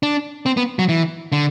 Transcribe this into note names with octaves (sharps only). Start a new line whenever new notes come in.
D4
C4
B3
F#3
E3
D3